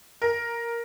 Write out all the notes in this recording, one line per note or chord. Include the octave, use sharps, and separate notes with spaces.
A#4